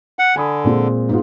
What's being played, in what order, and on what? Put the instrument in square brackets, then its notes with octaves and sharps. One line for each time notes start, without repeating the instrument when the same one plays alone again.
[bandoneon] F#5
[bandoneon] D3 [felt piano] G#5 B5 D#6
[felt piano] A#2 G#3 C4
G#2 B3 F4